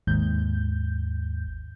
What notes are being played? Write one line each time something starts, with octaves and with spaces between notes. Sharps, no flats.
G#1 D#2 G#2 G6